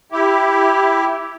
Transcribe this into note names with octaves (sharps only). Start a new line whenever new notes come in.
E4 G4